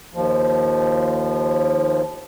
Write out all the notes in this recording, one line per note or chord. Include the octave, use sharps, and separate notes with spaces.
D#2 F3